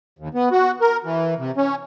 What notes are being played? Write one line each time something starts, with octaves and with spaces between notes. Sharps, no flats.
D#2
B3
F#4
A#4
E3
C3
C#4